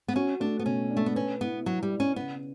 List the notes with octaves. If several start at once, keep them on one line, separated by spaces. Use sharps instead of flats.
B3
C#4 F#4
A3 D4
B3
B2 C#4
D4
A3
B3
C#4 B4
B3 E4
F#3 E4
G3
D5
C#4
C#3 B3